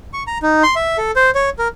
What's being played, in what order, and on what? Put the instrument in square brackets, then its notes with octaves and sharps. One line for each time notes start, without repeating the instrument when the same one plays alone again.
[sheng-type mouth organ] C#6
A#5
D#4
C6
E5
A4
C5
C#5
A#4